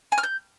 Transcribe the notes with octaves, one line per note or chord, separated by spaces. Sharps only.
G#5
F6
G6